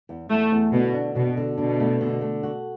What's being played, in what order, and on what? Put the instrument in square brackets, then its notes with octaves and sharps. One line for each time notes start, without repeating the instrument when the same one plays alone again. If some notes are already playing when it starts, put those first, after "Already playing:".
[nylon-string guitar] E2
[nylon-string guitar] E2 [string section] A3
[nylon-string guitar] E2
[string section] B2 [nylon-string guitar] D3
[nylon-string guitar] D4
[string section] B2 [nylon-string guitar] D4
[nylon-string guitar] D3
[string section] B2 [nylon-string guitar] D4
[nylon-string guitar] A3
D3
A3
F#4